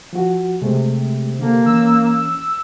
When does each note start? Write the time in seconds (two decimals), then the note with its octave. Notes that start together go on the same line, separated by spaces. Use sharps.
0.13 F3 F#4
0.62 C3 G#3 A3
1.39 D3 A#3 A4
1.66 E3 C#4 E6